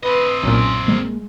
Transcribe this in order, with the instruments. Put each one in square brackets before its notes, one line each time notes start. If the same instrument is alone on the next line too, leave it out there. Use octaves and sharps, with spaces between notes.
[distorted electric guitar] C4 D#5 [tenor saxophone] B4
[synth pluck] B1 A#2 [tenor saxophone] C#4
[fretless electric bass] G3 A#3 [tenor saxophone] G#3